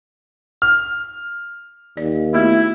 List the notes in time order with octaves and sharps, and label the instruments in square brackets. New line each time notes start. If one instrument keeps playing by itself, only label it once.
[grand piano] F6
[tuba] D#2 [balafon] D5
[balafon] A3 B3 F#4 [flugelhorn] E4